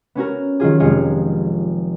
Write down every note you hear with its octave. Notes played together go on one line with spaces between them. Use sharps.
B3 C#4 F#4 A#4
D#3 F#3 F4 G#4
F1 G#3 F4 G#4 C#7